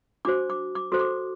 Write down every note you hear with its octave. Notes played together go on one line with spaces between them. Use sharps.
D4 F#4 C5 D6
D6
D6
F#4 A4 C5
D6